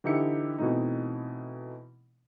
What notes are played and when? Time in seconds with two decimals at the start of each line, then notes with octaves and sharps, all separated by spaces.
0.04 D3 E3 D#4 G4 E5 C#7
0.58 B2 E3 A3 C4 D#4